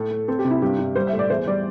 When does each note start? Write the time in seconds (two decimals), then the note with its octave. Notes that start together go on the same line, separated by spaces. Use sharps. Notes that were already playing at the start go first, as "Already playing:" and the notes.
Already playing: A2 A3 A4
0.11 A2
0.28 C4 A4
0.39 G4
0.45 C3
0.51 E4
0.62 G2 G4
0.79 G2
0.95 G3 C5
1.07 E5
1.13 A2
1.19 D5
1.30 E2 C5
1.47 G3 D5